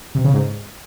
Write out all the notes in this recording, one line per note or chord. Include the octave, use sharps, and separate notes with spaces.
C3
C#3
G#2